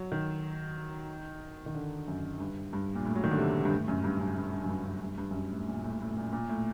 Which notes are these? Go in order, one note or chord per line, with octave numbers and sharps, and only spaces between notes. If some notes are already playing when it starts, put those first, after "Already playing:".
Already playing: F#3
D#3
D#3
D3
F#2
G2
G2
A#2
A2
F#3
D#3
D3
C3
G2
A2
F#2
G2
F#2
G2
G2
F#2
G2
F#2
G2
G2
F#2
G2
A2
A#2
A2
A2
A#2
A#2
A2